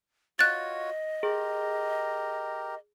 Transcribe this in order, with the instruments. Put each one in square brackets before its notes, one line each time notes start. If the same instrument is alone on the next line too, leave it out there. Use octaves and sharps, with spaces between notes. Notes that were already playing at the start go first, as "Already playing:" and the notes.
[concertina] F4 F#4 C#5 [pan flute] D#5 [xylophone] F#6 A6
[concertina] G4 A#4 [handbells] G#4